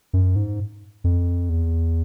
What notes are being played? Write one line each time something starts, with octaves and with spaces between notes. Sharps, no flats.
F#2
G#2
F2
E2